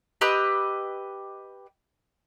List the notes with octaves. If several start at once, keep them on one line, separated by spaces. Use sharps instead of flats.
G4 B4 D#5 E6